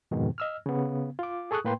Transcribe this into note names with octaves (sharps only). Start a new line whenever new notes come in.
F2 G#2 B2 D#3
D#5 E6 F6
C#3 B3
F4 D6
G#4 A4 C#6 D#6 F#6
A2 A#3 B4 G5 C6